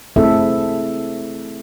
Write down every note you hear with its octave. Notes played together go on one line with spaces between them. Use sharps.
A3 C4 E4 G#4 A4 E5